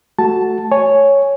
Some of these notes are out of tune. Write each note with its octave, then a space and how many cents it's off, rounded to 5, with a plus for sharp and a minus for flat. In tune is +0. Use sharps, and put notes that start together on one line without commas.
A3 +0 F#4 +5 A5 +0
C#5 +0 G#5 +0